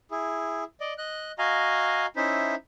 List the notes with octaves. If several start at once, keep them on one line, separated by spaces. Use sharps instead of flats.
E4 G#4
D5 D#5
D#5 F#6
F#4 D#5 F5 G#5 A#5
C#4 D#4 E4 C5 E5